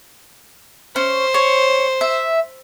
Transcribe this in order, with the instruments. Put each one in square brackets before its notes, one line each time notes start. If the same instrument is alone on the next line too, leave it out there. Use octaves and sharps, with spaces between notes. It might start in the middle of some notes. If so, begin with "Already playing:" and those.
[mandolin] C#4 [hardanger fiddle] C5
[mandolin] C#5
E5